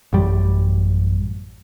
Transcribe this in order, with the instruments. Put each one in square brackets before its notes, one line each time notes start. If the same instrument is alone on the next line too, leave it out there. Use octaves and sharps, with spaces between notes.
[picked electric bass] A1 F#2 G3